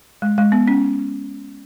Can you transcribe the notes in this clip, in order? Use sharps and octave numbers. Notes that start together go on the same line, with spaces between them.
G#3
G#3
B3
C#4